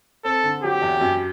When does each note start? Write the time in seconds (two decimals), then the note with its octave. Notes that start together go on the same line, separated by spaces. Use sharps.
0.25 C4 A4
0.43 D3
0.63 F#3 G4
0.82 E2
1.01 F#2